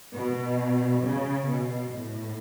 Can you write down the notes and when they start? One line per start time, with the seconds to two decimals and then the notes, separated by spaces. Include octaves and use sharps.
0.13 B2
1.04 C#3
1.48 B2
1.93 A2